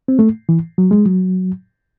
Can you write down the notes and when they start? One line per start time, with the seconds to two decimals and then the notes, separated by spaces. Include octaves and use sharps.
0.08 C4
0.19 A3
0.49 E3
0.78 F#3
0.91 G#3
1.05 F#3